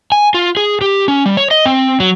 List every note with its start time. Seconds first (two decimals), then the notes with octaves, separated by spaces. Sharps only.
0.12 G#5
0.34 F4
0.57 G#4
0.81 G4
1.08 C#4
1.26 G3
1.37 C#5
1.51 D#5
1.66 C4
2.00 F#3